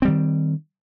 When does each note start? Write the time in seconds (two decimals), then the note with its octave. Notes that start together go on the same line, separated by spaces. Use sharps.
0.02 C4
0.05 G3
0.08 D#3